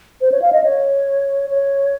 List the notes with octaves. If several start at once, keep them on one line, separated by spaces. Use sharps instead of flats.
C5
C#5
F5
D#5
C#5
C#5